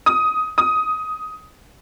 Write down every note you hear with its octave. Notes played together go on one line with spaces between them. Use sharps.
D#6
D#6